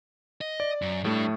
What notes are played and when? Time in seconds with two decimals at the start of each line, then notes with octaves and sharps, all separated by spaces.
0.41 D#5
0.60 D5
0.82 F#2
1.05 A2 G3 A3 D4